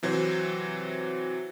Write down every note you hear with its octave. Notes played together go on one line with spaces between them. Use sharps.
C3 E3 F#3 C5